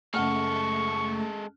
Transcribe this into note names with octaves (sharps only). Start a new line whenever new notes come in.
F#1 G#3 A3 A4 F#5 C#6 F6